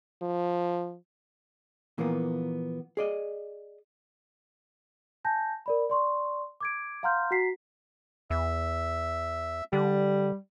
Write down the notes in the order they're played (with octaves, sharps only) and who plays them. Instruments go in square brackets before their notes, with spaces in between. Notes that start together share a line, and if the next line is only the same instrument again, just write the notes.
[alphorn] F3
[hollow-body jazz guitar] A#2 E3 F3 A#3 B3
G#4 D5 D#5
[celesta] G#5 A5 G6 A#6
A#4 D5 B5
D5 C6 C#6
D6 G#6 D7
F5 F#5 A#5 C6 F6 G6
F#4 F#5 A#5 B6 C7
[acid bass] E2 [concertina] E5
[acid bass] D3 [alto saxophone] G3